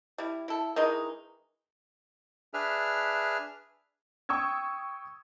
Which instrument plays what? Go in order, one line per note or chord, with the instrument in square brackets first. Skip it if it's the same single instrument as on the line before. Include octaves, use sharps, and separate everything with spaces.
[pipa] G3 E4
E4 A4
D#3 E3 G#3 D#4
[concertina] D4 G#4 B4 E5 F6
[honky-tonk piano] G5 C#6 D#6 E6 G#6